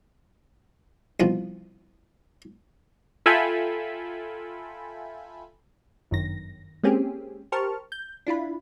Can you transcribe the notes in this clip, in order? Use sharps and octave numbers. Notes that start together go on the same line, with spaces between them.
C2 B2 F3
F4 A4 E5 G5 G#5 B5
G1 F#2 D#3 A#6
G#3 A#3 C4 C#4 G4 G#4
G4 A#4 C5 A5 C#6 F6
G6
D4 E4 F4 B5